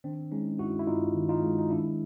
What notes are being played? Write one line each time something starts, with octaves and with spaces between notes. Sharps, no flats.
D#3 C4 D4
G#3 C#4 D#4
G2 E4 F#4
E4
G2 D#4 F4
D#3
D#4 F4
G#3
D#4
D#3 D4 E4